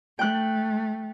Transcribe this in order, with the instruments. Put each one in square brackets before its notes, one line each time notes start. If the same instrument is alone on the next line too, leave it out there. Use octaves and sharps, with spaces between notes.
[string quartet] A3 [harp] G5 F#6